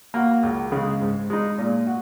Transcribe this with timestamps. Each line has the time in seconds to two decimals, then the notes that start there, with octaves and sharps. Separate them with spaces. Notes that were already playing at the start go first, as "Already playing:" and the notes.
0.14 A#3 F#4
0.43 C#2
0.72 C#3 G#3
1.01 G#2
1.30 G#3 D#4
1.58 A#2
1.87 F#4